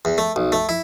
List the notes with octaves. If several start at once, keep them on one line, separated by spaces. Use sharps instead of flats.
E2
A3
B1
A3
E4